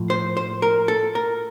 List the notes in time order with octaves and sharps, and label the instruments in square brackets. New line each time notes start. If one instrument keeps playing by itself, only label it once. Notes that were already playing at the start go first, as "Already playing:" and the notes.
Already playing: [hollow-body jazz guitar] A2 F3
C5
C5
A#4
A4
A#4